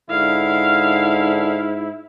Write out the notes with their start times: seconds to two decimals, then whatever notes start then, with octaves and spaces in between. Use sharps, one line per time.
0.10 G#2 D3 E4 F5